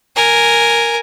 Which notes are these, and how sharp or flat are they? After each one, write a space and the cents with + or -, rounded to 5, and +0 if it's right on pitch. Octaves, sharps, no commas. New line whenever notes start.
A#4 +0 G#5 +0